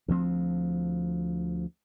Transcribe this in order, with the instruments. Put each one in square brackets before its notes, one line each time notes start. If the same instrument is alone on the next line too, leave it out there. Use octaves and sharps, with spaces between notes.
[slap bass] D2 F3 C4